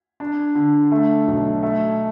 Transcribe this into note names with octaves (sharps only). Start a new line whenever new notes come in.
D4
D3
A3
B1
A3